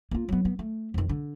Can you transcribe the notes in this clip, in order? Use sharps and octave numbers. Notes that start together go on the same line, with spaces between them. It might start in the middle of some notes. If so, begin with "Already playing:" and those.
A#3 F4
F#3 B3
B3
A3
F2 D#3
D3